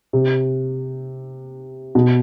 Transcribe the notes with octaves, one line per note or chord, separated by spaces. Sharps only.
C3
B2